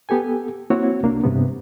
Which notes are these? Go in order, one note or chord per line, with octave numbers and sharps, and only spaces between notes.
B3 G4 A4 G#5
A#3 C4 E4 F#4 C#5
C2 A#3 D4
G2 C3 B3